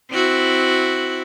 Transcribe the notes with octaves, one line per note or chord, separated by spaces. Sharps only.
C4 E4 F#4